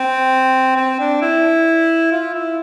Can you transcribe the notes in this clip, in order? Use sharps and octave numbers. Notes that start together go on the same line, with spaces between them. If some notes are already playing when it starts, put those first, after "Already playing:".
Already playing: C4
C4
D4
E4
F4
E4